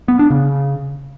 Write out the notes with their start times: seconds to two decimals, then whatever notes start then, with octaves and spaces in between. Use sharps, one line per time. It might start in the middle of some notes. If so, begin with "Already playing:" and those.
0.08 B3
0.19 D4
0.30 C#3